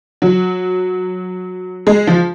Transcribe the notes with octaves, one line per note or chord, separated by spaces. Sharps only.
F#3
G#3
F3